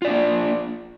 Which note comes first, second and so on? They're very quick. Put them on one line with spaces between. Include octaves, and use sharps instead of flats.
F4 D5 D4 A#3